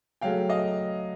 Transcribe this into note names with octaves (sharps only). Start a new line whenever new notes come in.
C#3 F#3 A3 F5 G5
D#5 F5